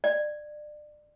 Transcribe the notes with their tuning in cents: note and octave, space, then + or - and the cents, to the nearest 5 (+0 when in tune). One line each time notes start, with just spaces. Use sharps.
D5 +30